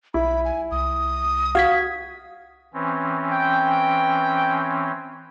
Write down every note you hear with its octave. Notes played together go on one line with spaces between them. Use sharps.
B1 E4 B5
G#5
C2 D#6
F#4 F5 G#6 B6
E3 C4 C#4
G5